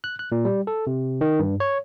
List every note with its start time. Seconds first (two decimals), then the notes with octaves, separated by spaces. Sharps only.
0.04 F#6
0.19 F#6
0.32 A#2
0.45 G3
0.67 A4
0.87 C3
1.21 D#3
1.39 G2
1.60 C#5